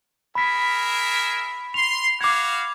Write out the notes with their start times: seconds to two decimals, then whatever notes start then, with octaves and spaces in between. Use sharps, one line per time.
0.35 G#4 A#4 E5 B5 B6
1.74 C6 F7
2.21 F#4 F5 D6 G#6